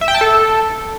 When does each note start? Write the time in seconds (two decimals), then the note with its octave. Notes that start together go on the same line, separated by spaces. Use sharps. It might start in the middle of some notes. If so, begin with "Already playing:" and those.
0.01 E5
0.08 G5
0.14 A5
0.21 A4